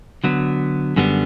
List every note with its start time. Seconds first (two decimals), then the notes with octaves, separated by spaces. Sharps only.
0.24 D3 F#3 B3
0.96 F#2 D3 G3 B3